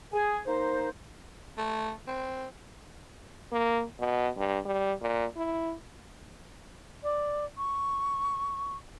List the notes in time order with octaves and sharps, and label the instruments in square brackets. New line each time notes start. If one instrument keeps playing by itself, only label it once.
[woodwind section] G#4 G#5
A#3 D#4 C5
[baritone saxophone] A3
C4
[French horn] A#3
B2
G2
G3
A#2
E4
[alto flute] D5
C#6